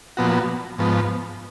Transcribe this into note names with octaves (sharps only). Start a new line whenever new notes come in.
A#2 F3 B3 F#4
G#2 F3 B3